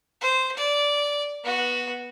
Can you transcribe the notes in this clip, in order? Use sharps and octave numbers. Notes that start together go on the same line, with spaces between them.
C5
D5
B3 F#4